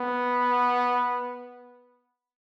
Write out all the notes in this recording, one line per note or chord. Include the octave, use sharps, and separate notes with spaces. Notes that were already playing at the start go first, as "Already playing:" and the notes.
Already playing: B3